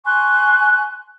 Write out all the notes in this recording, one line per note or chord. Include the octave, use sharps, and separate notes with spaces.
G#5 C6 C#6 F#6